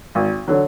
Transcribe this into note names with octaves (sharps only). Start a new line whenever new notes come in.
G#1
D3 F#3